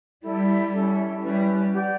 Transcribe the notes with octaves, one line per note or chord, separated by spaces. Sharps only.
G3 E4 A4 D5
C#4 E4 A4 E5
G3 C#4 E4 B4
G4 D5 F#5